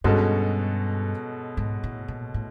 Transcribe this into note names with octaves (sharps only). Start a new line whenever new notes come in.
G2 B2 G#3 C#4 F#4 A4
G#2
A2
A#2
A2